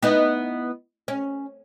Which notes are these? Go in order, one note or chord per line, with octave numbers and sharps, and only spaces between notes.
B3 D#4 E4
C#4